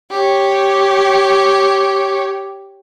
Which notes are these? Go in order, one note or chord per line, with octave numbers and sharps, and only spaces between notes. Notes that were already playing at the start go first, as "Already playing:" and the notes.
G4 C#5